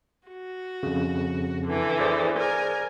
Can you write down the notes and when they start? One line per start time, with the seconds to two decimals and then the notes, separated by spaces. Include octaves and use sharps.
0.27 F#4
0.83 F2 C#3
1.64 D3 E3
1.99 G#4 C5 D5
2.37 A#4 G#5